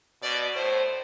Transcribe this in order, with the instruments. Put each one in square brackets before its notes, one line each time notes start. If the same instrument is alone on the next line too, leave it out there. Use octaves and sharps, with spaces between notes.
[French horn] B2 [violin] D5
[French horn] A2 [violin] C5